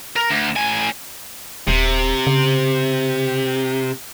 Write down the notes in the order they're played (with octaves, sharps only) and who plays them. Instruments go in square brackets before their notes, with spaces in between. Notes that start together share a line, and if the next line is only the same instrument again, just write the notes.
[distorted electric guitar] A#4
D2
A2 G#5
[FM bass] D#1 [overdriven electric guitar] C3
[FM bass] C#3